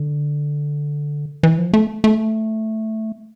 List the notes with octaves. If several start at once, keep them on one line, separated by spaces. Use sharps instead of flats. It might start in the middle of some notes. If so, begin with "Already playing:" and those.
Already playing: D3
E3
F3
A3
A3